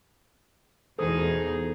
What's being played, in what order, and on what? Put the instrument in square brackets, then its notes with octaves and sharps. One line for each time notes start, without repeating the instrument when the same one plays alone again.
[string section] E2 B2 [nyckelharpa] D#4 G#4 [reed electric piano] A4 C5 D#6